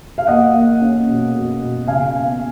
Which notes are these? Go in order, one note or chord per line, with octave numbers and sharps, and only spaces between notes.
F5
A#3 D#5 F#5
A#3
C#4
B2
B2
B2
C#3 F5 G#5
B3